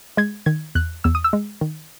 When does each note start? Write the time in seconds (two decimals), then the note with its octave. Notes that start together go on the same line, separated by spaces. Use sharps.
0.17 G#3 G#6
0.46 D#3 G#6
0.75 E2 F#6
1.04 E2 E6
1.15 D#6
1.24 E6
1.33 G#3
1.61 D#3